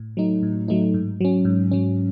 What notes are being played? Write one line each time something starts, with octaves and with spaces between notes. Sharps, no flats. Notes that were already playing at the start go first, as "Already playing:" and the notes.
Already playing: A2
F#3 A3 D#4
A2
F#3 A3 D#4
G#2
F#3 C#4
G#2
F#3 C#4